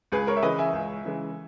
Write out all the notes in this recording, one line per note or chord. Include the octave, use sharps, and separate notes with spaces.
C#2 G#4 B4
A#4 C#5
E5
C#3 E3 G#3 B4 D#5
E5 G#5
C#2
C#3 E3 G#3